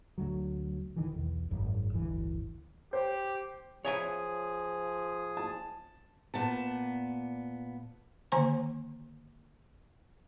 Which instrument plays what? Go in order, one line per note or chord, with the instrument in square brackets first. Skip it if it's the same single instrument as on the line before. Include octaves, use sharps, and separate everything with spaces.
[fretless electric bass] D2 F#3
B1 D#3 E3
B1 E2
G#1 F#2
D1 G1 E3
[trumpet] G4 [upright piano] C5
[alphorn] F3 [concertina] G#4 [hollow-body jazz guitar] C#5 E5 G#5
[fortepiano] A5
[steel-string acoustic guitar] A#2 B3 A5
[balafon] D3 D#3 A#3 C5 G#5 A#5